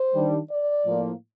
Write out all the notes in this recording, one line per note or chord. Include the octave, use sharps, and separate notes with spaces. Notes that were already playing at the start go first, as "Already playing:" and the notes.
Already playing: C5
D#3 G3 D4
D5
A2 F3 A#3